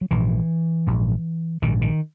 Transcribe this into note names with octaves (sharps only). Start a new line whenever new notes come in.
F#3
A#1 G#2 E3
A#1 G#2
A#1 G#2 D#3
D#3